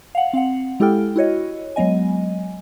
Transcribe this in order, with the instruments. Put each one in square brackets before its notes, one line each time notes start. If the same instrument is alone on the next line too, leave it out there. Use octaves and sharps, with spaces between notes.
[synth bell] F5 F#5
C4 F5 F#5
G#3 E4 G4 A4 G5 F6
E4 F#4 C#5 D#5
F#3 G#3 B3 D#5 G#5